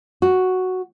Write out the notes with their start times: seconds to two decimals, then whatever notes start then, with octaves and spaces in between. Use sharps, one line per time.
0.22 F#4